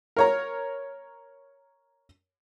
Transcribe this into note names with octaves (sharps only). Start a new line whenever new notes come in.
A#4 C#5 A#5